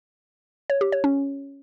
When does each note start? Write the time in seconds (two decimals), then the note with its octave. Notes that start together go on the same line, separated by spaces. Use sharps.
0.70 C#5
0.81 G4
0.92 C#5
1.04 C#4